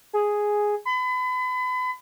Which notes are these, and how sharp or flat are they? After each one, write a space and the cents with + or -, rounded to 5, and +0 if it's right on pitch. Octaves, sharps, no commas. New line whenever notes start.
G#4 +0
B5 +35